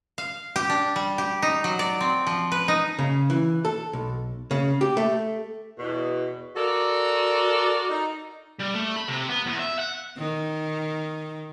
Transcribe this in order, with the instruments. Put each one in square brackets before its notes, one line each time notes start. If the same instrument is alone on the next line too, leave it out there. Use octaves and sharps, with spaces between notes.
[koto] F5
G4
D4
G3
G4
D#4
F#3
D5
C4
F3
B4
D#4
[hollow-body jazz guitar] C#3
E3
A4
B1
C#3
G4
A3
[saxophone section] E2 B2
F#4 A4 A#4 D5
D#4
[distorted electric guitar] G3
A3
B5
C3
B3
E2
E5
F#5
[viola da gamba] D#3